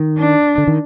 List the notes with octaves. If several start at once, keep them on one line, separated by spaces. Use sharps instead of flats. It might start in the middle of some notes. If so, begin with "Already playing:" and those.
Already playing: D#3
D4
D3
D#3